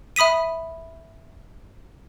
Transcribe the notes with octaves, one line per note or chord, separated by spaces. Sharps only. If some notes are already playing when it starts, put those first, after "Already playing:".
E5 B5 D#6 B6 D#7